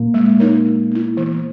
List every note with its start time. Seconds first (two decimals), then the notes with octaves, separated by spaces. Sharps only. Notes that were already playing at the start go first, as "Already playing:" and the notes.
Already playing: A#2 A#3
0.14 G#3
0.40 D#4 A#4 C#5
0.65 G#3
0.91 B3 E4
1.17 E3